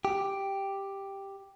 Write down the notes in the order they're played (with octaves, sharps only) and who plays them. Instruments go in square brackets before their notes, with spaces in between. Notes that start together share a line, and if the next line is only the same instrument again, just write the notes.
[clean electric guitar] G4